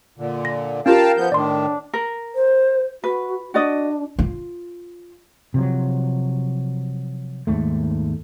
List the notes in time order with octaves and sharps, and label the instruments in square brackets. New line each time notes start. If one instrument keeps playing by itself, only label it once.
[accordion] A#2 D3
[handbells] A#6
[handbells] C#4 F4 G4 [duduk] A#4 [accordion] F5 G5 A5
[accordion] F3 B3 G6
[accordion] A2 D#3 [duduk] D4 [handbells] D5 C6
[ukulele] A#4
[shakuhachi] C5
[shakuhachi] F#4 [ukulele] B4
[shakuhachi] D4 [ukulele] F#4 D5 D#5
[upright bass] F4
[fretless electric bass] C3 F3 F#3
D#2 G#2 A3